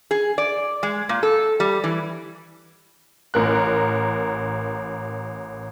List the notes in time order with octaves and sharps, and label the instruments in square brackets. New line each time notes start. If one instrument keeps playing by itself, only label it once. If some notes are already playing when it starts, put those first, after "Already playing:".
[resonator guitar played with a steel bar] G#4
D5
G#3
A#2
A4
G3
E3
[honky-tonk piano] A1 A#4 F#6